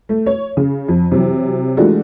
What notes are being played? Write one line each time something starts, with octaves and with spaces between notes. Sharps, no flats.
A3
C#5
C#3
F2
C3 E3 F#3
E3 G#3 A3 D4 F4 F#4